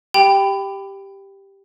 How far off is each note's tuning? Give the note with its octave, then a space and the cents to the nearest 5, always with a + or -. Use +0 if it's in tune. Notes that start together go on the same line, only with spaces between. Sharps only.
G4 +0 G5 +0 B5 +20